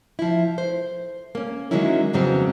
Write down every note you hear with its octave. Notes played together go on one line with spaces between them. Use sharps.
F3 E4
C5
A#3 C#4
D#3 F#3 G#3 A#3 C#4 E4
F2 G#2 C#3 F#3 B3 C4